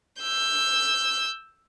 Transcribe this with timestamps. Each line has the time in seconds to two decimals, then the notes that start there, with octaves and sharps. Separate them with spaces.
0.21 E6 G6